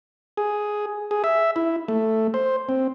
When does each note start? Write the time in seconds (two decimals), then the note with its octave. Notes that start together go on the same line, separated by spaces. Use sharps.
0.37 G#4
1.11 G#4
1.24 E5
1.56 E4
1.88 A3
2.34 C5
2.69 C4